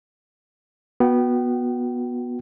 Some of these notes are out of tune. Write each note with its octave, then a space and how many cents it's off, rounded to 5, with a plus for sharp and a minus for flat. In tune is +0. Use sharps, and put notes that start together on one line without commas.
B3 -15 F#4 -25 G5 -30